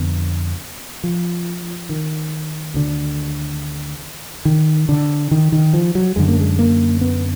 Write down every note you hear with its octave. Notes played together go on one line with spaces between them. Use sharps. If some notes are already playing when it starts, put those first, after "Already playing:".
Already playing: F2 D3 B3
F3
D#3
D2 D3
D#3
D3
D#3
D#3
F3
F#3
F#2 D3 G#3
A#3
G#3
A#3
B3